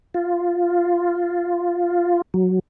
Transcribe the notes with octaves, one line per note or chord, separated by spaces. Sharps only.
F4
F#3